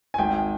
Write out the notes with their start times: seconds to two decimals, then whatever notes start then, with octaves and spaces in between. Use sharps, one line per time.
0.14 G#5
0.18 G#1 G5